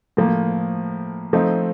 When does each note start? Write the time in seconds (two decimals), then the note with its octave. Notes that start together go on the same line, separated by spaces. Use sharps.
0.17 A2 F3 A#3
1.33 F3 A3 C4 D#4